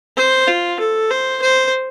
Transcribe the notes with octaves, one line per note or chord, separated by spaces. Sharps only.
C5
F4
A4
C5
C5